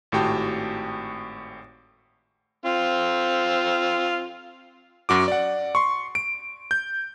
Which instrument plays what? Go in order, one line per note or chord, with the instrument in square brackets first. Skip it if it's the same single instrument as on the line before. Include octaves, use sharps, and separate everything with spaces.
[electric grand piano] G#1 A2 F#4 G4 G5 A5
[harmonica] C4 F4
[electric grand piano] F#2 F#4 D6
D5 F#5
C6 C#6
D7
G6